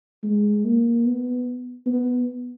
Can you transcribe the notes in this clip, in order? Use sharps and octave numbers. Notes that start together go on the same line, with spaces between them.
G#3
A#3
B3
B3